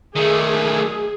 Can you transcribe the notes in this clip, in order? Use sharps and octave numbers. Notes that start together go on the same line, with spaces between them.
D#3 A3 G#4